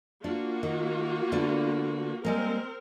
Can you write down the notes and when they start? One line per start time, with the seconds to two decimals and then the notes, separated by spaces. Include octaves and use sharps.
0.24 A#3 D4 F4 F#4
0.63 D#3
1.32 D3 B3 D4
2.25 G3 G#3 A#3 C4 A#4